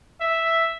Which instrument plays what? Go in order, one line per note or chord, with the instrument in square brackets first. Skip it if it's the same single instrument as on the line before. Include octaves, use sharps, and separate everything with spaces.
[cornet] E5